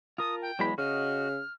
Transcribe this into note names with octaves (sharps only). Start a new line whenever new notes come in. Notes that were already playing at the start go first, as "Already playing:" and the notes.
F4 A#4 A5 D#6
G5
E2 F#3 G#3 B5
C#3 F#4 D#5 F6